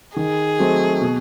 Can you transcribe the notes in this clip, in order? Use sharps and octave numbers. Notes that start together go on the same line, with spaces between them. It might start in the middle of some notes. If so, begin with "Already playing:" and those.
D#3 G#4
F#3 A3 C4 D#4
B2